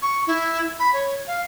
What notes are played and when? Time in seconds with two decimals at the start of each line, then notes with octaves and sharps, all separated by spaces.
0.02 C#6
0.27 E4
0.79 B5
0.93 C#5
1.27 F5